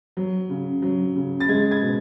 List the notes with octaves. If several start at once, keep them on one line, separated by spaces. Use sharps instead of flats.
F#3
C#3
F#3
C#3
A6
G#3 G#6
G#6
B2